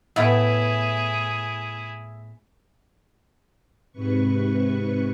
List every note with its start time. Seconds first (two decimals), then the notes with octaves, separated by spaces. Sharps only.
0.16 A2 B3 E4 G#4 E5
3.92 G#2 C3 B4 C#6